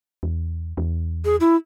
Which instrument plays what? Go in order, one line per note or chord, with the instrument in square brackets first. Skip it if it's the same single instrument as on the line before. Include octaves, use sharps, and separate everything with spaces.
[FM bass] E2
E2
[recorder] G#4
E4